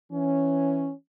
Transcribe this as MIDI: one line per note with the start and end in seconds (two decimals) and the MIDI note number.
0.12 0.92 52
0.12 0.92 61